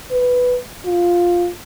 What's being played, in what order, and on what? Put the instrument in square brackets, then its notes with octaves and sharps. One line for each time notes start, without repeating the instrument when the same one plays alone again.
[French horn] B4
F4